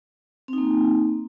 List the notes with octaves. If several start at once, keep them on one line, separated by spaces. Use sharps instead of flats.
A#3 C4 D#4